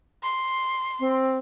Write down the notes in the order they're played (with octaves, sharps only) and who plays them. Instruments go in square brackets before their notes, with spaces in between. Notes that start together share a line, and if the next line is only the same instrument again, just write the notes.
[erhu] C6
[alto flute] C4